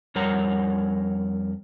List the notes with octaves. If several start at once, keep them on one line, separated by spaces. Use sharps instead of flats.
F2 G3 A#4 C#5 F#5 A#5